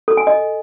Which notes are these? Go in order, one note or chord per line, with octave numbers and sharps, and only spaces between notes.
A4
G#5
D#5